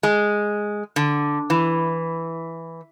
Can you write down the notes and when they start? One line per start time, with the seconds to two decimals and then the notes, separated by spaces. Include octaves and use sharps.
0.03 G#3
0.96 D3
1.50 E3